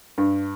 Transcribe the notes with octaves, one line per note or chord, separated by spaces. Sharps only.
G2